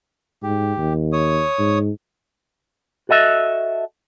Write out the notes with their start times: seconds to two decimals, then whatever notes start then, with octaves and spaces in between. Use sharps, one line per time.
0.43 G#2 G4
0.78 D#2
1.13 C#5 D#6
1.59 G#2
3.09 F#4 A4 D#5 E5